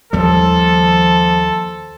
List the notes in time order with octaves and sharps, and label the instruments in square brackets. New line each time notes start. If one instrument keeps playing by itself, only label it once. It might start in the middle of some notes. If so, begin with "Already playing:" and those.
[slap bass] D#2 G3 [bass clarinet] F3 [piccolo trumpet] A4